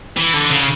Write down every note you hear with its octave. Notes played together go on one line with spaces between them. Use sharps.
E3
D3
C#3